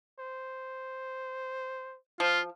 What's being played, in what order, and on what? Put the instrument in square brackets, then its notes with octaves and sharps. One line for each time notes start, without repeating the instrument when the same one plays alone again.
[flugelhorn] C5
[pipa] F3 [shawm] F4